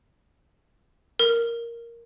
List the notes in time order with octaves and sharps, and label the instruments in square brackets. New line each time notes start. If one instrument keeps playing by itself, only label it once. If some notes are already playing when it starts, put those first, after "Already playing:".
[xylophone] A#4